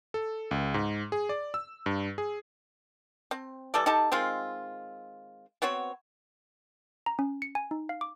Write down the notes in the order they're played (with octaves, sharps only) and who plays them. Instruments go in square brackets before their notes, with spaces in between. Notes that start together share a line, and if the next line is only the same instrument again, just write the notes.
[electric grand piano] A4
C#2
G#2
G#4
D5
E6
G2
G#4
[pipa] C4
E3 G3 A4 D5
D#4 G4 A4 A5
D#3 G#3 C4 F4
B3 C4 F#4 C#5
[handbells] A#5
C#4
C#7
G#5
D#4
F5
D6